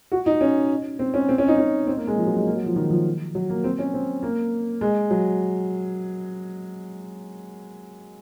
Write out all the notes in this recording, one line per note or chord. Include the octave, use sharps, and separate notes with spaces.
F#4
D#4
C#4
C4
C#4
C4
C#4
D#4
C#4
C4
A#3
G#3
F3
F#3
G#3
A#3
F#3
F3
D#3
F3
F#3
A#3
C4
C#4
C4
A#3
G#3
F#3